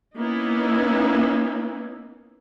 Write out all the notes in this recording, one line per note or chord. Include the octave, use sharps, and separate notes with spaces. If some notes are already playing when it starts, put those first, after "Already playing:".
A#3 B3 C#4 D#4 E4